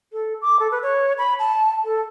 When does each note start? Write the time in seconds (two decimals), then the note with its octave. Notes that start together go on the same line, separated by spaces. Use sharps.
0.13 A4
0.42 D6
0.59 A4
0.71 B4
0.83 C#5
1.18 B5
1.39 A5
1.85 A4